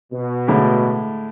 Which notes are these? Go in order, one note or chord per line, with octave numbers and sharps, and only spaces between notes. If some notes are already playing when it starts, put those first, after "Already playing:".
B2
A2 D3 G#3